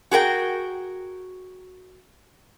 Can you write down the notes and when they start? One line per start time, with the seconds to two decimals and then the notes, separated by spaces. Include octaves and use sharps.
0.11 F#4 G#4 A#4 G5